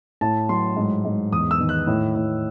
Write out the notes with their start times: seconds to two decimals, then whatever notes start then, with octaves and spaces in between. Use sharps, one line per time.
0.21 A2 A5
0.49 F#3 C6
0.76 G#2
1.05 G#2
1.32 E2 D#6
1.51 E6
1.60 D#3
1.69 F#6
1.87 A2
2.16 A2